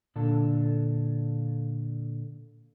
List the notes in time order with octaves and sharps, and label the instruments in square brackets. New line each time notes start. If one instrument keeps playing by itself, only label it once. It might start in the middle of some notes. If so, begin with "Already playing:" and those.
[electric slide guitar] A#2 D3 D4 A4